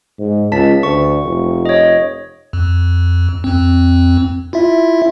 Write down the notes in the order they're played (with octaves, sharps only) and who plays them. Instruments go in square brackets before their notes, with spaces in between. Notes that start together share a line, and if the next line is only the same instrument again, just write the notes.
[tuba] G#2
[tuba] C#2 [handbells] A5 B6
[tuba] D2 [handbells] C#6
[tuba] F1
[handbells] C#5 D#5
[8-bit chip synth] F2
F2 C4
E4 F4 E5